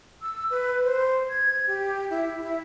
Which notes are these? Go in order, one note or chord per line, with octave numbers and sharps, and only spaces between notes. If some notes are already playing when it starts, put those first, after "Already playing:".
E6
B4
C5
G#6
G4
E4
E4